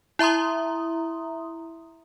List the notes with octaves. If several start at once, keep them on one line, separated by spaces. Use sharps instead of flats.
E4 E5 A#5 C6 D#6